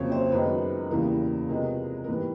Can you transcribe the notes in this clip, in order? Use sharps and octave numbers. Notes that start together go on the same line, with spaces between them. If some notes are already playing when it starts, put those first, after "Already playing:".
Already playing: F2 C#3 F#3 A#3 C5 C#5
C5
F#2 D#3 G#3 B3 B4
E2 C#3 E3 G3 A#3 A#4
C3 F3 G#3 B3 A#4
A#4
G#2 E3 G3 B3 B4